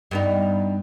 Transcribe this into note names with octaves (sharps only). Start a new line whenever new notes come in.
G2 B3 D#4